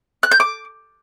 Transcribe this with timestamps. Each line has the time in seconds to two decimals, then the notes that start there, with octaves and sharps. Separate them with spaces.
0.23 F#6
0.32 G6
0.40 D6